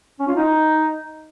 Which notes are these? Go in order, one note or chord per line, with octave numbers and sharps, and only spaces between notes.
C#4
F4
D#4